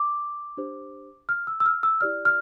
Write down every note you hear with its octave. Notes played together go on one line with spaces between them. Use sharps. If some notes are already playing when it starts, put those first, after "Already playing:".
Already playing: D6
D4 G4 C5
F6
E6
E6
F6
E6
E4 G4 D5 F6
F6